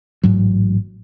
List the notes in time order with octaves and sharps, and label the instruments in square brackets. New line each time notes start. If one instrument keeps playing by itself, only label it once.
[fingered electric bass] A1 G#2 F#3